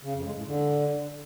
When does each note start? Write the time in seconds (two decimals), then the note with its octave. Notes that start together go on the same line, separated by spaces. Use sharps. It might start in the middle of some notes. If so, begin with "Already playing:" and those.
0.03 C#3
0.14 F2
0.24 G#3
0.35 A2
0.46 D3